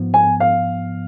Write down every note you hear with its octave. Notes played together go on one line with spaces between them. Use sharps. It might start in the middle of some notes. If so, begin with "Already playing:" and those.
Already playing: G#2 F3 B3
G#5
F5